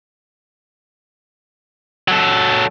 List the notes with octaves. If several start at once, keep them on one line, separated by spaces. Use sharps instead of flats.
F#3 A4